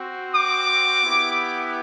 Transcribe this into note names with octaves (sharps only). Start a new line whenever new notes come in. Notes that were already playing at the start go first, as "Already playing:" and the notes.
Already playing: C4 F#4
D6
B3 E4 G4